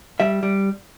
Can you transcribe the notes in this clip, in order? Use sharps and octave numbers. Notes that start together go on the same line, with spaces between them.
G3 E5
G3